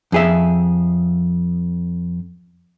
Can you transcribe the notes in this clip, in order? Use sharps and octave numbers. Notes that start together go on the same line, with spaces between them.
F2 G#4 E5